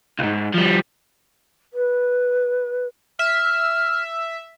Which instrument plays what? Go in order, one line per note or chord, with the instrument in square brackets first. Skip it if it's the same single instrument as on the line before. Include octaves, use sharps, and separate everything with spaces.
[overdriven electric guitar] C#2 G#2
F3 G3
[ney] B4
[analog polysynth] E5 [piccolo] F6